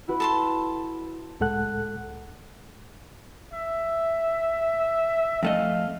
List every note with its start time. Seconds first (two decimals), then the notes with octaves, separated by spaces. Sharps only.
0.08 E4 F#4 B4
0.20 A4 A5 C6
1.40 C#2 A2 G#3 A4 F#5 F#6
3.54 E5
5.43 F2 A3 D#5 F5